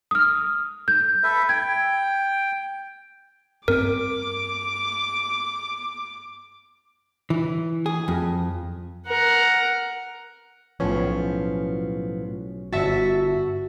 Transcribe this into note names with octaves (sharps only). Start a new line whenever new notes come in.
D#6 F6
G6
A4 B4 E5
G5 G#6
G2 C4 A#4 D6
E3
G#4
F2
A#4 F#5
B1 A2 F3 B3 C#4
G1 F#4 E5 A5